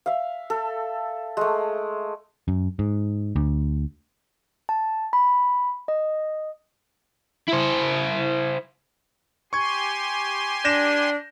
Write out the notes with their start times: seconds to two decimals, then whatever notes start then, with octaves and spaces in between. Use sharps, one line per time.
0.06 E5 F5
0.50 A4
1.37 G#3 A3
2.48 F#2
2.79 G#2
3.36 D2
4.69 A5
5.13 B5
5.88 D#5
7.48 E4 C5
9.53 G4 G#5 C6 C#6 G#6
10.65 D4 G6 A#6 E7